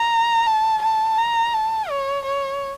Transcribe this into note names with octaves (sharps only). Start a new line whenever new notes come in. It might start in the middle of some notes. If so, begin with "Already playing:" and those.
Already playing: A#5
A5
A5
A#5
A5
C#5
C#5